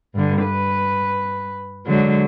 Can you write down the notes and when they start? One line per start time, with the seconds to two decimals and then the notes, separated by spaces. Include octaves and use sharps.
0.15 G2 D3
0.43 B4
1.86 D3 F#3 G#3